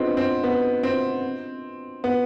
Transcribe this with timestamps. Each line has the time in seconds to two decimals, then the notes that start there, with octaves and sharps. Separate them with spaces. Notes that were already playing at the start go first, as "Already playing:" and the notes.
Already playing: B3 C4 D4 F4 G#4 B4 D#5
0.17 C4
0.44 B3
0.83 C4
2.04 B3